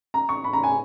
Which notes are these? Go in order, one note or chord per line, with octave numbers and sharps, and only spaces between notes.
A#5
C#6
B5
A#5
G#5